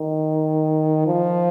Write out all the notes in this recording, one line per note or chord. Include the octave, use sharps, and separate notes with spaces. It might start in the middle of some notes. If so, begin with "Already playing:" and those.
Already playing: D#3
F3